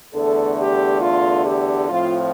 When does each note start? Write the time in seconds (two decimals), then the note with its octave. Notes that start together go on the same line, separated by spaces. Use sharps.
0.14 E2 D3 A3 A4
0.59 G4
1.02 F4
1.45 G4
1.89 A2 F3 C4 F4